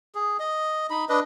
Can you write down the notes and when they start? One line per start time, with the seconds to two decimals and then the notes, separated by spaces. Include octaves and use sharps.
0.15 G#4
0.40 D#5
0.90 D#4 B5
1.09 D4 B4 D#5